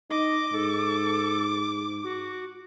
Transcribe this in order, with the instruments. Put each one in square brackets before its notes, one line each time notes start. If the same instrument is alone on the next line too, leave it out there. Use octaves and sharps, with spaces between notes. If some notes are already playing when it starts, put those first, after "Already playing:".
[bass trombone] D#4 [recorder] D#5 [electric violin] D6
[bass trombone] G#2 [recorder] A4
[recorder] F#4